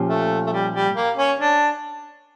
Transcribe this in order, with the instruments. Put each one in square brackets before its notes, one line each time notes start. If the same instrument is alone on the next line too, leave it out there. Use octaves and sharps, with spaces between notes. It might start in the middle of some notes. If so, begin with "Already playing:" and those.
Already playing: [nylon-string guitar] A#2 F3 C#4 G4
[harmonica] A3
A3
G3
G3
A#3
C#4
D4